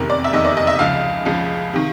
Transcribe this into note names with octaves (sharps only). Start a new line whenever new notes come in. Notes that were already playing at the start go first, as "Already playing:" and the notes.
Already playing: F1 E2 C3 D#3 A#4
D5
E5
F1 E2 C3 D#3 D#5
D5
D#5
E5
C#2 C#3 F3 F5
C#2 C#3 F3
C3 D#3